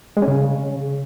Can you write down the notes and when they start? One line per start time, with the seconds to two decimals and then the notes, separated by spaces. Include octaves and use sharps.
0.17 G#3
0.22 C#4
0.28 C#3